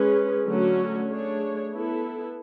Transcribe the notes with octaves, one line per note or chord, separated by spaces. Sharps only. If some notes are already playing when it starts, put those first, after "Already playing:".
Already playing: G#3 C#4 G#4 B4
D3 F#3 A3 C#4 F#4
A3 D4 G#4 C#5
B3 E4 A4